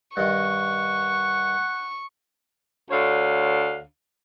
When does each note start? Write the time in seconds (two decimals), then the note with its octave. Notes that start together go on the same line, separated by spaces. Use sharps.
0.17 G2 D#3 F#5 C#6
2.91 D2 D3 C#5 F5